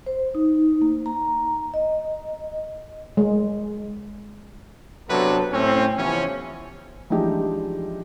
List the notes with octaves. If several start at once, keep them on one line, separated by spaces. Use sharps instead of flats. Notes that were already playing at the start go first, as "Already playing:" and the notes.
C5
D#4
A#3
A#5
D#5
G#3
C3 F#3 B3 D4 A4 B4
A2 C4 C#4
C3 E3 F3 B3 C#4
E3 F3 G#3 D4 D#4 G4